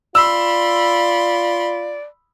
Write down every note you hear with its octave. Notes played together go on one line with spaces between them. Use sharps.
F4 D5 B5 C6 E6